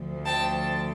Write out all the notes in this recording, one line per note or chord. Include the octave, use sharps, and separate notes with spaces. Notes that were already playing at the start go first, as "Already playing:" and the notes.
Already playing: D2 D3 F3
G5 A5